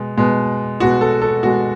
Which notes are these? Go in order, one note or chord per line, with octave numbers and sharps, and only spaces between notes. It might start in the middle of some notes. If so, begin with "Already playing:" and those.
Already playing: B2 G#3
B2 G#3
B2 G#3 F#4
A4
A4
B2 G#3 F#4